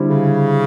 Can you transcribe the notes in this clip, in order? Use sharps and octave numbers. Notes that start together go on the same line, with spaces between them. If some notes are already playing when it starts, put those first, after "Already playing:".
Already playing: D3 G3 C4 E4
C#3